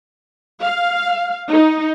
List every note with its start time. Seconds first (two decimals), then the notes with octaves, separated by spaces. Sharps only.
0.62 F5
1.49 D#4